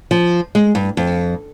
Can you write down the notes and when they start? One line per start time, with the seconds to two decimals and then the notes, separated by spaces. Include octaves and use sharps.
0.11 F3
0.55 G#3
0.75 G2
0.97 F2